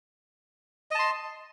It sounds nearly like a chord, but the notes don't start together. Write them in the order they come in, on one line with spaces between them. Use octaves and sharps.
D#5 A5 C6